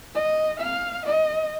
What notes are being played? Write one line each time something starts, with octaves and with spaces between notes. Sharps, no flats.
D#5
F5
D#5